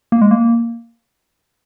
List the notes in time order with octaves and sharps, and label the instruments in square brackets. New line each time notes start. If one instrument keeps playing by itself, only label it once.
[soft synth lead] A#3
G#3
A#3